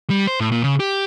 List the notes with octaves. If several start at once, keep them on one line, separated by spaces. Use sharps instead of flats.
G3
C5
A2
A#2
C#3
G4